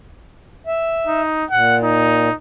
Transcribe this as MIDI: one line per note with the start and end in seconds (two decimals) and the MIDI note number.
0.67 1.21 76
1.07 1.45 63
1.50 2.29 46
1.50 1.77 78
1.83 2.34 63